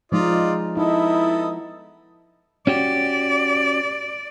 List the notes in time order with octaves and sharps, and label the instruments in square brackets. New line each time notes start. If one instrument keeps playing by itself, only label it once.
[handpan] F3 G#3 D#4 [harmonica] F4 D5 D#5
[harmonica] B3 A4 D#5 [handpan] D#4 [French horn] E4
[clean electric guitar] C#4 F#4 G4 [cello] D5